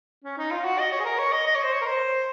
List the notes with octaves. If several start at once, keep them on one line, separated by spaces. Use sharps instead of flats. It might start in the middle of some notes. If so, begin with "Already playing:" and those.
C#4
D#4
F4
F#4
D#5
C#5
G#4
A#4
C#5
D#5
D#5
C#5
C5
C#5
A#4
C5